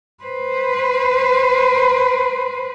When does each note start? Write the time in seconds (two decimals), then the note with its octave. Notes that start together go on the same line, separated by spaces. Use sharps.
0.23 B4 C5